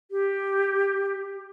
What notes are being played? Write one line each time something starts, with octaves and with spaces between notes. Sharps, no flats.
G4